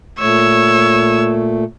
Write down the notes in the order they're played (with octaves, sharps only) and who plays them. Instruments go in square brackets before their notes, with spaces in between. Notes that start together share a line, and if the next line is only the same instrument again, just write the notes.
[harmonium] A#2 A3 [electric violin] C#5 E6